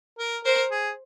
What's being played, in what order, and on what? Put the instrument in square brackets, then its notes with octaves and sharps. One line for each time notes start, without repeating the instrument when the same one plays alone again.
[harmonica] A#4
[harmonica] A#4 [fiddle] C5
[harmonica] G#4